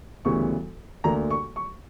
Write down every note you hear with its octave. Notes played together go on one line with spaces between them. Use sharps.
D2 C#3 E3 G3 B3 C#6
D2 D3 A#3 A#5
C#6
C#6